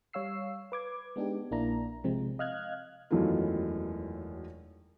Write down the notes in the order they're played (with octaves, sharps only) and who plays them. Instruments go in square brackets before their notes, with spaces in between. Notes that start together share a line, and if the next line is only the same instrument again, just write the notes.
[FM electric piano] G3 C#5 F5 E6 C7
B4 D6 G#6
G#3 B3 D4 D#4 G4
A#1 A#3 D4 E4 A#5
C3 F3 G#3 C4
D#5 F5 F6 F#6 G#6
[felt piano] E1 F#2 D#3 E3 A3 F4